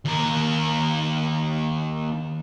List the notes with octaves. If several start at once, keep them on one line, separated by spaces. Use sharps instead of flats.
D#2 A#4